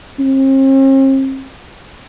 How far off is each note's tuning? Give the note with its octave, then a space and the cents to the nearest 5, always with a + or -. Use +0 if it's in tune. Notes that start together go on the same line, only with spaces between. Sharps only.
C4 +45